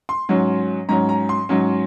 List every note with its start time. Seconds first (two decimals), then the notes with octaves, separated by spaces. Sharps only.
0.09 C6
0.29 G#2 F#3 C#4
0.89 G#2 F#3 C#4 A#5
1.09 A#5
1.29 C6
1.49 G#2 F#3 C#4